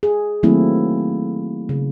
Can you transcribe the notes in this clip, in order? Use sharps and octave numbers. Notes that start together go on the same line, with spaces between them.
G#4
D#3 F#3 A3 A#3 C4 E4
C#3